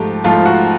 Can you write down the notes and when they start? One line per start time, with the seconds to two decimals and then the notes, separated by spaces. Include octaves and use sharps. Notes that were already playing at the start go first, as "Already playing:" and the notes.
Already playing: G#2 F3 A3 G4
0.24 G#2 F3 A3 F4
0.46 F#4